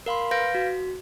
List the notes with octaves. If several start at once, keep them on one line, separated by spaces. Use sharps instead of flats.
A#4 F5 B5 C6
B4 F5 G6 A#6 D7
F#4